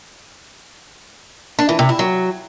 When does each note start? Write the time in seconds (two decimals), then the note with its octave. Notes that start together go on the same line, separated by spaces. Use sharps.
1.59 D4
1.69 E3
1.79 C3
1.89 E4
1.99 F#3